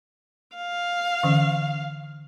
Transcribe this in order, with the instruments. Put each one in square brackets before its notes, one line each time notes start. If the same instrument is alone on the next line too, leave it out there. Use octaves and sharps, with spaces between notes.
[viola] F5
[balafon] D3 E3 C#4